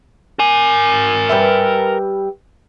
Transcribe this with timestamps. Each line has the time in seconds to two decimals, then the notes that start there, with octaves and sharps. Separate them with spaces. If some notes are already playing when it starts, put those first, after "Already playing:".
0.39 A#4 G#5
1.29 G3 B4 E5